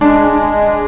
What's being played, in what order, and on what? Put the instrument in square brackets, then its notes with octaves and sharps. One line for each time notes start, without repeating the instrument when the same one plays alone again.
[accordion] G#3 [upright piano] D4